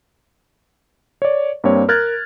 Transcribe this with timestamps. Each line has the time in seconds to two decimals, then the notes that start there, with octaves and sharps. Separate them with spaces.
1.22 C#5 D5
1.64 G2 A#3 C4 C#5
1.89 A#4 F6 F#6 G#6 A6